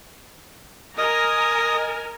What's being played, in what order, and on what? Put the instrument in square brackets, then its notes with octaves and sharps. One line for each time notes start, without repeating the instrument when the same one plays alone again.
[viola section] A#4 G#5 A#5 [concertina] D#5 D#6